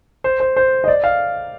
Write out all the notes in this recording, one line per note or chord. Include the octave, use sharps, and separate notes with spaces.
C5
C5
C5
D#5
D5
F5